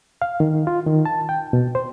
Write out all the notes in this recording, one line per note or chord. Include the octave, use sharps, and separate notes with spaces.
F5
D#3
F4
D#3
A5
G5
B2
C5